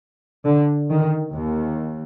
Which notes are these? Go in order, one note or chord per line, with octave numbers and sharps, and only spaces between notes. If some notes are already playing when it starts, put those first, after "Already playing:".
D3
D#3
D#2